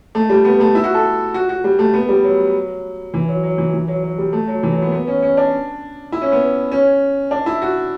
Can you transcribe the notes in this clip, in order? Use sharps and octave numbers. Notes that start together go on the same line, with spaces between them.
A3
G3
B3
A3
E4
F#4
A4
F#4
F#4
G3
A3
B3
G3
F#3
E3
F#3
F#3
E3
E3
F#3
F#3
G3
A3
F#3
E3
F#3
B3
B3
C#4
C#4
D4
E4
C#4
B3
C#4
D4
E4
F#4